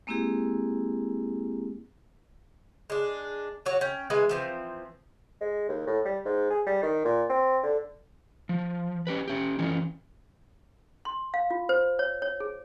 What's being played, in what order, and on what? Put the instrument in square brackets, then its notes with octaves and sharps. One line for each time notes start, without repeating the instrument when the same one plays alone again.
[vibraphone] G#3 A#3 C4 E4 G4 G#4
[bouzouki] G#3 D4
F#3 F#4 C#5 D5
C#4 G5
E3 G#3 B4 G#5
E3 F3 C4
[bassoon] G#3
D#2
A2
G3
G#2
G#4
G3
D#3
A#2
C4
D3
[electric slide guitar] F3
C#4 G4 B4
C#4 G4
E3 F3 C#4
[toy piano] C6
F5
F4
C5
C#5
C#5
G#4